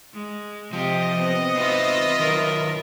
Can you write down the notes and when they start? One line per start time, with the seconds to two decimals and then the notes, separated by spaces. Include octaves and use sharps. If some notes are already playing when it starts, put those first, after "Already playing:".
0.14 G#3
0.73 C3 F3 G4 D#5
1.19 B3 C4
1.56 C4 D#4 F4 B4 E5
2.20 D#3 F#3 A#4